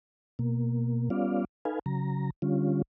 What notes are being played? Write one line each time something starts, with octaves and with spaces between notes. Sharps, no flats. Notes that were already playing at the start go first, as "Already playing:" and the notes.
B2 A#3
G3 B3 C#4 F4 D5 F5
D#4 A4 B4 F5 G#5
C#3 F#3 A#5
D3 G3 C#4 F4